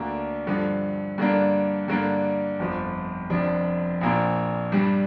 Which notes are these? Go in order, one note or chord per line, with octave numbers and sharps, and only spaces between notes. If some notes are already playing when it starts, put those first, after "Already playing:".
Already playing: D2 D3 A#3 D4
G2 D3 F3
G2 D3 A#3 D4
G2 D3 A#3 D4
G1 F2 F3
F1 F2 F3 D4
A#1 A#2 F3 A#3 D4
G2 G3 D4